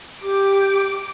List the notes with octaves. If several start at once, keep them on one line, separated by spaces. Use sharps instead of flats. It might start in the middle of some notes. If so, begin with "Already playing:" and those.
G4 D6